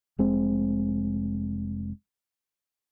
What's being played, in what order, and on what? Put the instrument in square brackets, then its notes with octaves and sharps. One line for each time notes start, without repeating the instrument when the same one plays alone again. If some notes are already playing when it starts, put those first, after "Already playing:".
[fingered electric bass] F1 G#3 C4